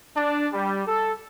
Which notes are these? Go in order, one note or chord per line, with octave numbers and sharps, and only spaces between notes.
D4
G3
A4